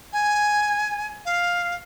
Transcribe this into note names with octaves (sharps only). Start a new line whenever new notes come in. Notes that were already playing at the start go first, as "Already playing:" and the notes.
G#5
F5